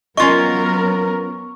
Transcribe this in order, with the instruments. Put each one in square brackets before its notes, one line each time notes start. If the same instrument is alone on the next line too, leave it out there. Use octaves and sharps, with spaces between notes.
[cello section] F#3 B3 A#4 [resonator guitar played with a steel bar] C#4 F4 D#5 [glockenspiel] C#6